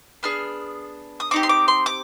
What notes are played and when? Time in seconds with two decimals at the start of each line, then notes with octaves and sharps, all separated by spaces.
0.23 B3 D4 G#4 F6
1.20 D#6
1.31 C4 D#4 G4 D6
1.43 C6
1.49 D6
1.68 C6
1.86 D6